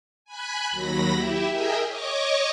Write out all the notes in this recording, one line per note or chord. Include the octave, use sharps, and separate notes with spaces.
G#5 B5 F#6
D#2 F#3 B5 A#6
E4 G4 E5
G#4 A#4 D#5 E5 G5 G#5
C#5 D#5 C#6 D6